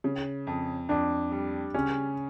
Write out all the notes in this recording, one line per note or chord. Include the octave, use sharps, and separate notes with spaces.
C#3
F2
F2 D4
G3
C#3 C#4